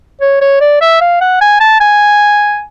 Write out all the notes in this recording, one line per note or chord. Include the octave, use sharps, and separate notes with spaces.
C#5
C#5
D5
E5
F5
F#5
G#5
A5
G#5